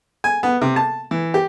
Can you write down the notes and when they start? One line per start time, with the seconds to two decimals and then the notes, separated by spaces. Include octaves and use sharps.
0.24 G#5
0.43 B3
0.62 C3
0.76 A5
1.11 E3
1.34 G4